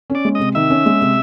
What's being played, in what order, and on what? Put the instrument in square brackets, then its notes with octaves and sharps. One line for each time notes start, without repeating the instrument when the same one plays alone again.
[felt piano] C#4
[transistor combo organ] D5
[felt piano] G#3
[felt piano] C3 [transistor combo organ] D#5
[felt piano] D#3 [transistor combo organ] E5
[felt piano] C#4
G#3
C3